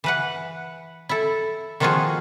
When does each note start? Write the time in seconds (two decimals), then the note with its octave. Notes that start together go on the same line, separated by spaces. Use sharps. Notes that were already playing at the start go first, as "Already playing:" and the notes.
0.04 E3 B4 F#5
1.09 E4 A4
1.80 D#3 F3 A#3 F4 F#4 G#4